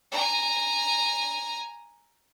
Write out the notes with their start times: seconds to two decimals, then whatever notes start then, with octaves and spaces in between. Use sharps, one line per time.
0.11 G#5 A#5